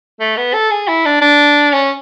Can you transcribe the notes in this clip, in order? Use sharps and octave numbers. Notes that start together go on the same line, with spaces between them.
A3
B3
A4
G#4
E4
D4
D4
C#4